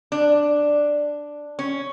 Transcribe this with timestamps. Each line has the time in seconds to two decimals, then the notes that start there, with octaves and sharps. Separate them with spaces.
0.12 D4
1.59 C#4